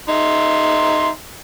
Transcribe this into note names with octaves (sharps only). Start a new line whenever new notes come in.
D#4 E5 C6